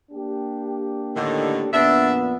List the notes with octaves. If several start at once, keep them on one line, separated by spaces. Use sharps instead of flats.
A#3 D4 G4
A2 D3 D#3
F2 A#2 B3 D4 E5